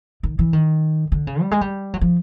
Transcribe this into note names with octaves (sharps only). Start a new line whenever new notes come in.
D#3
E3
D#3
D3
C#3
G3
G#3
G3
F#3
F3